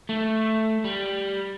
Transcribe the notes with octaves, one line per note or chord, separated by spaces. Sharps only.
A3
G3